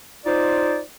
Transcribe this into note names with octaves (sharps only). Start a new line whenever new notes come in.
D#4 F4 C5 D5